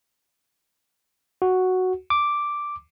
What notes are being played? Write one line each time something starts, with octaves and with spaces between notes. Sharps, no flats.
F#4
D6